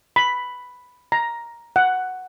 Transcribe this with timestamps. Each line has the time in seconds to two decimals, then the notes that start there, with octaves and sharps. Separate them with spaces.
0.16 B5
1.12 A#5
1.76 F#5